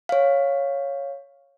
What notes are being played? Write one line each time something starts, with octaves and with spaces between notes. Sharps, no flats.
C#5 F5